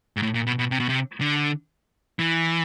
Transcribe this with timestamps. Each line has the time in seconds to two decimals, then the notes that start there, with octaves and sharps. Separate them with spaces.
0.17 G#2
0.23 A2
0.34 A#2
0.47 B2
0.59 B2
0.71 C3
0.80 B2
0.89 C3
1.21 D3
2.19 E3